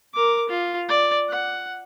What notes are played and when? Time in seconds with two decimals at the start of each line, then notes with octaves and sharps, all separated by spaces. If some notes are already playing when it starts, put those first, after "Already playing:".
0.14 A#4 D6
0.49 F4
0.89 D5
1.29 F#5